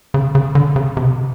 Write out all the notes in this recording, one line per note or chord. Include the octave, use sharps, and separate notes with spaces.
C#3
C#3
D3
C#3
C3